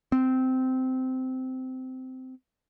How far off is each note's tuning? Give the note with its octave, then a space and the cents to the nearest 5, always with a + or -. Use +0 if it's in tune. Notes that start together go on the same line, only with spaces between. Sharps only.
C4 -15